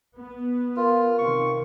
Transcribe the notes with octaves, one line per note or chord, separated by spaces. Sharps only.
B3
F4 A#4 B4
C3 D#3 C#6